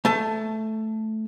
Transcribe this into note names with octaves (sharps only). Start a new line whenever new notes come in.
A3 A5